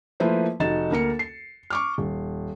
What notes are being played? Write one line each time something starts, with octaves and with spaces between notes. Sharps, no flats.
F3 A3 A#3 E4 B4 C5
F1 D#4 F#4 A6 E7
D2 A#3 A#4 C#7
C7
C#6 D6 F6
D#1